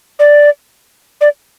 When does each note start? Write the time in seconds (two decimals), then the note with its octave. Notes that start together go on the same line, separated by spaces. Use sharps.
0.19 D5
1.21 D5